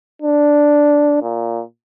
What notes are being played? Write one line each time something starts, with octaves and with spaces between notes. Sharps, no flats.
D4
A#2